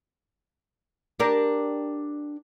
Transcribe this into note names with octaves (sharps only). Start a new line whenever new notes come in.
D4 G4 A#4